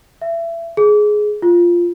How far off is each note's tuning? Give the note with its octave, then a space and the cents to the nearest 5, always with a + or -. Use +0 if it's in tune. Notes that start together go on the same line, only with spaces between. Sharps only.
E5 +30
G#4 +10
F4 -5